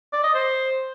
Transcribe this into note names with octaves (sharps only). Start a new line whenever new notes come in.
D5
D#5
C5